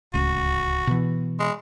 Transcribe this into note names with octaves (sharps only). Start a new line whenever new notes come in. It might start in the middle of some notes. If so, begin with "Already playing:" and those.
D1 C#2 F#4
B2 E3
G#3